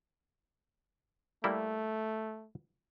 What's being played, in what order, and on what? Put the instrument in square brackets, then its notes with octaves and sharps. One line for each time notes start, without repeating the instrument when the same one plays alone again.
[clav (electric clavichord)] G3 A#3 E4 [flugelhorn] A3